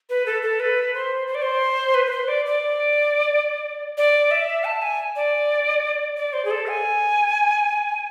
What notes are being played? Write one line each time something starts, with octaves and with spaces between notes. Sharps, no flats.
B4
A4
A4
B4
C5
C5
D5
C5
B4
B4
C5
D5
D5
D5
E5
A5
G#5
D5
D5
C5
G#4
A4
G#5